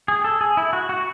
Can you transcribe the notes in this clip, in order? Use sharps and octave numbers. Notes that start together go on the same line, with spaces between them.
G#4
A4
G#4
E4
F#4
F#4